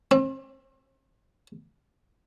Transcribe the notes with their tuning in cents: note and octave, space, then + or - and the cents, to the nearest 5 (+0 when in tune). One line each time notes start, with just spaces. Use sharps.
C4 +40